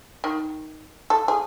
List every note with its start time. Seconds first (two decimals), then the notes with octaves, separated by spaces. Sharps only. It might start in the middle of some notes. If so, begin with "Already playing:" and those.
0.24 D#3
1.10 A4
1.28 G#4